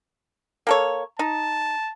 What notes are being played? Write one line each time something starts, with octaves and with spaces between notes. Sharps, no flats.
A#3 A4 C#5
D#4 A5